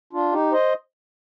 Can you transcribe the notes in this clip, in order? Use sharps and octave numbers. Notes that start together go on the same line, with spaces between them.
D4 F4
D#4 G4
C5 D#5